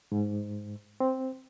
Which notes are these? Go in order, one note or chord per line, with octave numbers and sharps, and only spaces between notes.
G#2
C4